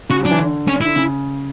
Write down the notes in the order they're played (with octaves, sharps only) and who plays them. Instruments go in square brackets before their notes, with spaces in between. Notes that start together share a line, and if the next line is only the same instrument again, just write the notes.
[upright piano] C#3 [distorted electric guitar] F#4
[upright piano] F#3 [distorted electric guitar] D4
[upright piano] E3
D3
[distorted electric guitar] C#4
[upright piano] D3 [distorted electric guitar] E4
[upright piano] C#3